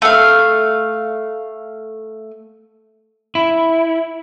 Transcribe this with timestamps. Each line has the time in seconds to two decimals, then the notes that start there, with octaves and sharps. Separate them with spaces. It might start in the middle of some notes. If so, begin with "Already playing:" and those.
0.02 A3 F5
3.35 E4